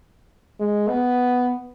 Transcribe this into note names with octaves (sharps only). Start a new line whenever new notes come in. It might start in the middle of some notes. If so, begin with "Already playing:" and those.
G#3
B3